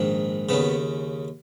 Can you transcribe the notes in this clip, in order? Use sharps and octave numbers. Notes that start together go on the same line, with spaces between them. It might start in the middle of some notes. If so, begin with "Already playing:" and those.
Already playing: A#1 G#2 D#3
D#2 C#3 B3